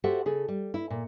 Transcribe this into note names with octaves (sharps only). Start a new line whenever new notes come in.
F#4 G4 A4 C5 E5 F#5
C#3 G#4 A4
G3
E4
A#2